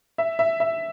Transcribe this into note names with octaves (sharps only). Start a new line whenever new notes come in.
E5
E5
E5